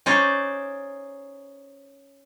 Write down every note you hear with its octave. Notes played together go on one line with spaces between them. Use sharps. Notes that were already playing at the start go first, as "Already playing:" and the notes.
C#4 D#4 C5 D5